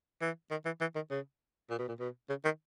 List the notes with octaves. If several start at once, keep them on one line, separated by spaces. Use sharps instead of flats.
E3
D#3
E3
E3
D#3
C#3
A#2
B2
A#2
B2
C#3
D#3